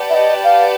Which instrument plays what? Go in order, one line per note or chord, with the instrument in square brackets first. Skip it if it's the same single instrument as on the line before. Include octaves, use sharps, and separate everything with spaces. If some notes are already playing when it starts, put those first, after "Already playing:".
Already playing: [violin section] G4 B4 D5 F#5 A5
[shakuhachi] E5
D#5
F5